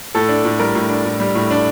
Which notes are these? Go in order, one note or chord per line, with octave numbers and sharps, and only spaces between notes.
A2 A4
D4
A2
G3 A#4
A2
D4
A2
G3
A2
D4